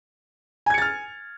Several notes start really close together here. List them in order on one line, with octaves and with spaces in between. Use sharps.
G#5 G#6 C#7 A6 F6